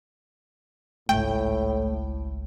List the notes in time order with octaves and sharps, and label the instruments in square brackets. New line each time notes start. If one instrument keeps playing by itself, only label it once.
[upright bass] G#1 C#2 [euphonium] A2 [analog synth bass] A3 [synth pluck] G5